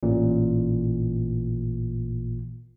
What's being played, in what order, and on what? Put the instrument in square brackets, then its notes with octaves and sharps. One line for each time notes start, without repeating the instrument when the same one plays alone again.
[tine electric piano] A1 A#2